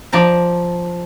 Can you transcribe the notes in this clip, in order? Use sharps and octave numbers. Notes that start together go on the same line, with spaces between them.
F3 D5 A5 A#5